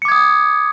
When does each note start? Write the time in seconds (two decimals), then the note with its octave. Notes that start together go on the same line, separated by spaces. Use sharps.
0.02 C#7
0.05 D6
0.08 G#6
0.12 D#6